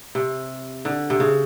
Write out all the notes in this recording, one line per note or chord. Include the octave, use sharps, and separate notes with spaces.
C3
D3
C3
C#3